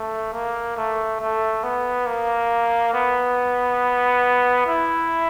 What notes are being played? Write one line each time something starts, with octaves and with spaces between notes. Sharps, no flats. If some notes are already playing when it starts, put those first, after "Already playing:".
Already playing: A3
A#3
A3
A3
B3
A#3
B3
E4